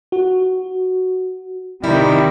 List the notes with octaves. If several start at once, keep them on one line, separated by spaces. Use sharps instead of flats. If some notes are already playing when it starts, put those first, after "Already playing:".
F#4
C3 D#3 G3 E4